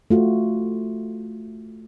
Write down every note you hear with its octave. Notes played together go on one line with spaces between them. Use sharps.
A3 F4 F#4